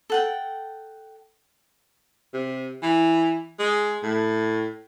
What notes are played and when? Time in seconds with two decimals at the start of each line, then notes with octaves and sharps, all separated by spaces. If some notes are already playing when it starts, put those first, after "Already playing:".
0.10 A4 F#5 G5
2.34 C3
2.83 E3
3.59 G#3
4.03 A2